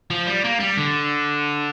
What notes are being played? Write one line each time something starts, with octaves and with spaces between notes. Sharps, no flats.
F3
G3
A#3
G3
D3